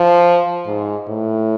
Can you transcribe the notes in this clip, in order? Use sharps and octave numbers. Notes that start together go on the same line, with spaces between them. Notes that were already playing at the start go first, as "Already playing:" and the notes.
Already playing: F3
G#2
A2